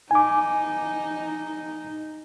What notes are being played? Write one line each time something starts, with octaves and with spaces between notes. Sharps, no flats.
D#4 G#5 D6